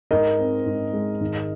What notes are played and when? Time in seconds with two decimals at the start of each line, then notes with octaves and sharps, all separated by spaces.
0.11 G#2 A#4 D#5
0.39 C4
0.66 G#2
0.93 G#3
1.20 G#1